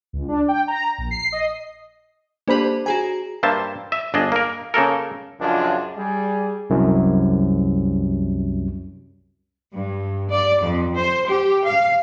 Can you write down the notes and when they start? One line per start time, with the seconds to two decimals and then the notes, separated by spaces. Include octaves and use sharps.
0.13 C#2
0.28 D4
0.48 G5
0.68 A#5
0.98 A#1
1.11 C7
1.32 D#5
2.48 A#3 D4 G4 C5 B5
2.86 F#4 G#4 G#5 A#5
3.43 G2 A#3 C5 E5 A5
3.92 E5
4.14 G1 D4 G#4 D#5
4.32 A#3 A#4
4.74 C#3 A#3 A4 A#4
5.40 C#2 F#2 F3 G#3 D4 F4
5.97 G3 G#4
6.70 C2 F#2
9.74 G2
10.31 D5
10.62 F2
10.97 C5
11.27 G4
11.66 F5